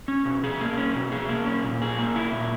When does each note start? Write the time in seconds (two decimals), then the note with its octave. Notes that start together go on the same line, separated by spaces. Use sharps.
0.08 C#4
0.25 B2
0.44 G#4
0.61 A#3
0.78 C#4
0.95 B2
1.12 G#4
1.29 A#3
1.46 C#4
1.64 A#2
1.82 G#4
1.99 A#3
2.16 E4
2.33 A#2